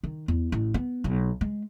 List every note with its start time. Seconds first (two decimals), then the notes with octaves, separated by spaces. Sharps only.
0.03 D#3
0.28 E2
0.52 A1
0.74 B3
1.04 B1
1.41 G#3